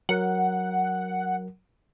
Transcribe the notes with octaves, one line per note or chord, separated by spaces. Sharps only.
F#3 A#4 F#5